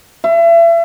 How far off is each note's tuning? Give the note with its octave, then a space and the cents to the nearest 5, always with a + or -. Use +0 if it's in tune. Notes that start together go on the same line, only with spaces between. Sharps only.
E5 +35